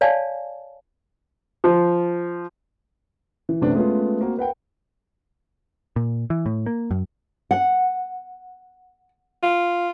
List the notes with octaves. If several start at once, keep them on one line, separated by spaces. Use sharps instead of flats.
C#5 D5 F5 G#5 A5
F3
E3
F#2 C3 A3 B3 D4
G#3 A3 B3 C#4 F4
A#3 C4 F#4 A#4
A#4 B4 F#5 G5
A#2
E3
A2
A#3
F#2
F#5
F4